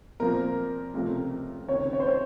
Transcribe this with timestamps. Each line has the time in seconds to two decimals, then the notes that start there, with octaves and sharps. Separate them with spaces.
0.20 A#2 F3 C4 A#4
0.94 C#2 C3 F3 A3
1.68 C#2 C3 D#3 C#5
1.93 C#5
2.00 C5
2.07 C#5